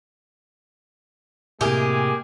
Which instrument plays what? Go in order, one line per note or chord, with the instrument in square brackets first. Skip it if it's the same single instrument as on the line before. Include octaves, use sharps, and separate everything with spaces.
[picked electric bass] A2 C3 [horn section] G#3 A#3 G#4 [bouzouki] G4 [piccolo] G#5